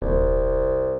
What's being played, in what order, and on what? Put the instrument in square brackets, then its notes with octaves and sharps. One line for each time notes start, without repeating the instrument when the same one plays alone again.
[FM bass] D#1 [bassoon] C2